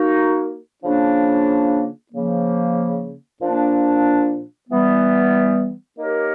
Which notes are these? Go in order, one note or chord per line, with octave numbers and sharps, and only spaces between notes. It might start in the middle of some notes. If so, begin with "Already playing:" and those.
Already playing: A#3 D#4 F#4
C#3 F3 A#3 D4
C#3 F3 A#3
A#2 F3 A#3 D4
E3 G3 B3
A#3 D#4 G4 A#4 C#5